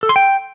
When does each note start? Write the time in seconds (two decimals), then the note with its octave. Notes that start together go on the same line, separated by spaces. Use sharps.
0.03 A4
0.09 C6
0.16 G5